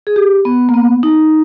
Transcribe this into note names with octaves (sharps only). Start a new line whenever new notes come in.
G#4
G4
B3
A#3
B3
D#4